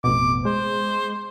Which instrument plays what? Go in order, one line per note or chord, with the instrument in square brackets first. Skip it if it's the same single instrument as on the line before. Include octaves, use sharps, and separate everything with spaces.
[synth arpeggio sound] A1 F2 B2 [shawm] D6
[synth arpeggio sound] G#3 [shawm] C5